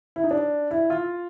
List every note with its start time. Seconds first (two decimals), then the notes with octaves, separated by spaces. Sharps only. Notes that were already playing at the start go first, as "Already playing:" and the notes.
0.16 E4
0.24 D#4
0.31 D4
0.71 E4
0.90 F4